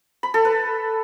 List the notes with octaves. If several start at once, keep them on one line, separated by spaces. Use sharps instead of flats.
B5
A4
B4